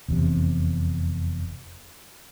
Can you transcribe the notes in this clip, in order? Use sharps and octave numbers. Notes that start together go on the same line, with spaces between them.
F1 E2 A2 C3